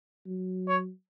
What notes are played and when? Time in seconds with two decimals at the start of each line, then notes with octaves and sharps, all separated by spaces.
0.26 F#3
0.68 C#5